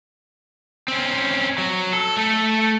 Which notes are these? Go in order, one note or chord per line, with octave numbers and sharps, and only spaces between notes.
C4 C#4
F#3
A4
A3 A4